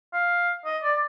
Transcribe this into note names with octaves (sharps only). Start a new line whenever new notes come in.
F5
D#5
D5